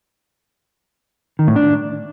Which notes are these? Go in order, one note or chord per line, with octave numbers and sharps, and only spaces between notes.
D#3
A2
D4